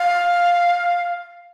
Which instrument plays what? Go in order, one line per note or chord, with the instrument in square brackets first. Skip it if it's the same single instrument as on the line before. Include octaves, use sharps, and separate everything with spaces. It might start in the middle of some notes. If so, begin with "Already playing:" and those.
Already playing: [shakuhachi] F5